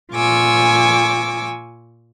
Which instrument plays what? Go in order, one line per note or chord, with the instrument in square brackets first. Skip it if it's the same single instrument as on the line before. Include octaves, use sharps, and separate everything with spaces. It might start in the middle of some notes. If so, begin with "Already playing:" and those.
[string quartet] A#2 F4 G#5 C#6 D6 E6